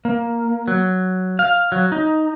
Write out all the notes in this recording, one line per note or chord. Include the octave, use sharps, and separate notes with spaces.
A#3
F#3
F5
F#3
D#4